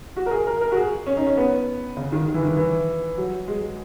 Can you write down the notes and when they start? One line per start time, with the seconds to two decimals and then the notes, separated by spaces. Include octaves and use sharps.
0.17 F#4
0.26 A#4
0.31 G#4
0.47 A#4
0.61 A#4
0.72 F#4
0.76 G#4
1.07 C#4
1.17 D#4
1.27 C#4
1.37 B3
1.97 C#3
2.12 D#3
2.28 D#3
2.34 E3
2.43 D#3
2.57 E3
3.18 F#3
3.48 G#3